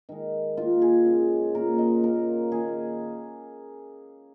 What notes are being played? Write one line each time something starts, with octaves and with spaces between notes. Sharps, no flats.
D#3 G#3
D#3 A#3 F4
G#4
C#3 G#3
A#2 A#3 A#4
D#5
C#3 A#3 A#4
D#3 A#3 G#4